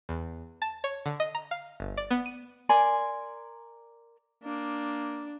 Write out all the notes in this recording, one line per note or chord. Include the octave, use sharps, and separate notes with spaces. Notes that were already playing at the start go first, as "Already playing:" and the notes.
E2
A5
C#5
D3
D#5
A#5
F5
G1
D5
B3
D#7
A#4 D5 G#5 C6
A#3 D4